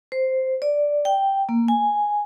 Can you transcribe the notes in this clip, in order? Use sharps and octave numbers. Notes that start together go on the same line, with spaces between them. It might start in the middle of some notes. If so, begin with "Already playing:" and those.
C5
D5
G5
A#3
G#5